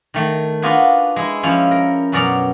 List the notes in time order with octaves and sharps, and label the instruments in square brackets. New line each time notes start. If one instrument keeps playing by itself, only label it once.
[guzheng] D#3 A3
D4 F4 F#4 G#4 B4
G#3 E4
F3 C#4 E4
A#4
F#2 B2 C#4 D5 A#5